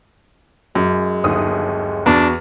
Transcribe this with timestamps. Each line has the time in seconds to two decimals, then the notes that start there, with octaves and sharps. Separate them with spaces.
0.75 F#2 G#3
1.24 G1 D#2 D#6
2.06 E2 D4 F#4